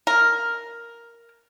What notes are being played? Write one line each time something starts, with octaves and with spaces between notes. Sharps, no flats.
A#4